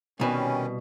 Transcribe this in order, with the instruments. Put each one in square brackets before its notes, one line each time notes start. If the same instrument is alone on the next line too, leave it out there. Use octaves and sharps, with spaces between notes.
[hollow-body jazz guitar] C2 B2 B4 [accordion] D#3 G3 C#4